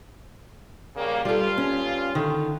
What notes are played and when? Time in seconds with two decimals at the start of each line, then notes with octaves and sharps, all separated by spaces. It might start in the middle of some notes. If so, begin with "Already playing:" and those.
0.96 C#3 G3 A#3
1.25 G2 G3 F4 A4
1.58 C#4
2.15 D3 D#3